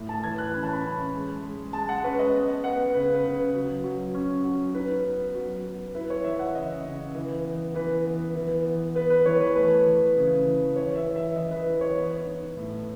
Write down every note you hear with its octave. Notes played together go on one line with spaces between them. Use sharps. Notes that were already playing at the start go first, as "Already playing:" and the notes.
Already playing: A2
A5
E3 G#6
F#6
C#4 B5
A5
B5
C#4
G#3
G#3
G#3 A5
F#5
C#4 B4
D#5
B3
B3 F#5
C#3 B4
B4
C#3
F#3
F#3
C#4
F#3
D#4 B4
B3
F#3
B3
E4 B4
C#5
E3 E5
F#5
C#3 D#5
C#3
E3
B3
E3 B4
B3
E3
B3
B3 B4
B4
E3 C#5
B4
A3 B4
E3
C#3
E3
E3 C#5
E5
E3
E5
E3 D#5
B4
E3
C#5
B3 B4
D#4
A2